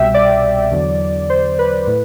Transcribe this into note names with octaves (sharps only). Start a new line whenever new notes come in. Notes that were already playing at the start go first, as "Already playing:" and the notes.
Already playing: C2 B2 G3 E5 G5
D5
E2 D3 F#3
C5
B4
A2